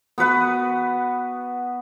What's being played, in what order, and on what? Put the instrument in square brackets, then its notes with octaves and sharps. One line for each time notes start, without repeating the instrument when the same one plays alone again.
[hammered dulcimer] B3 F#4 B4 F#5